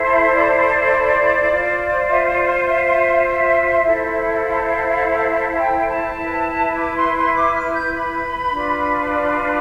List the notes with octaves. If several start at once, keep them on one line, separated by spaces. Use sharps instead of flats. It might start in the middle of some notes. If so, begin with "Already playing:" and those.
Already playing: E4 A4 C5
E5
D5
F4 C5
E5
D5
E5
E4 A4 C5
F5
A5
G5
A5
E4 B4
D6
C6
C6
D6
F6
G6
B5
D4 F4 B4
D5
F5
F5